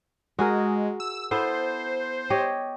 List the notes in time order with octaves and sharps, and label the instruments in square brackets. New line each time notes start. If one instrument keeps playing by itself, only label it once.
[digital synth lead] G#3 [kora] F#4 G#4 A#4
[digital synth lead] E6
[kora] B3 E4 A4 [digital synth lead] C5
[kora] G4 C#5 D#5